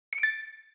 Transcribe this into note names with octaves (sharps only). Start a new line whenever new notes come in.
C#7
D7
A6